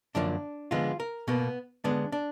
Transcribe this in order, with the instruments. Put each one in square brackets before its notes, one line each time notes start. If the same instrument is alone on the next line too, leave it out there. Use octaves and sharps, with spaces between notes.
[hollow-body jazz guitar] F#2 D3 F3 A#3 D4
D3 F3 G#3 B3 F4
A#4
B2 A#3 B3
D3 G#3 B3 D4
D4